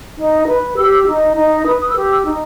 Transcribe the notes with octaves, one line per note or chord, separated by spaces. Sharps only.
D#4
B4
G4 E6
D#4
D#4
B4 D#6
D#6
E6
G4
E6
D#4